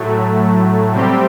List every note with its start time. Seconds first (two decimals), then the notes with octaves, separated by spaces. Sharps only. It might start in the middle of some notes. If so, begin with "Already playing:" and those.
Already playing: A2 F#3 A3
0.93 C3 G3 C4 G4